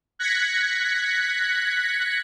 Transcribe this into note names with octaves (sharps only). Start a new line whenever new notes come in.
F#6 G#6 A#6 B6 C#7